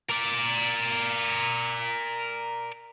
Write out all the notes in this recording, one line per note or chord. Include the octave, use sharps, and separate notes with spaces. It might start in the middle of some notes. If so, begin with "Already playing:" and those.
A#4 D5